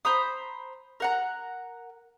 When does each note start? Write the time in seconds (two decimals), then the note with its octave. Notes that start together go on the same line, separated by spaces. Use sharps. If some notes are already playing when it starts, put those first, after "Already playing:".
0.05 C5 A#5 B5 D#6
1.00 A#4 F#5 A#5